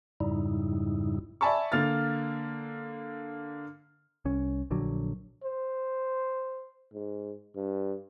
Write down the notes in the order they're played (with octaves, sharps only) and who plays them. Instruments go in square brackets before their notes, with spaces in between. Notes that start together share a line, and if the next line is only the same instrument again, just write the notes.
[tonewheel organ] F2 G#2 C#3 G3 D#4 E4
[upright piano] D5 E5 G#5 A5 B5 C#6
D3 A#3 F6 A6
[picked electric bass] C2 C#4
A#1 D3 F#3
[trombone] C5
G#2
G2